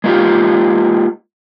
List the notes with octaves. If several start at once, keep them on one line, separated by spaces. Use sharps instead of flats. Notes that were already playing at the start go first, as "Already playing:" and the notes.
G#3 A#3 D#4 F4 G4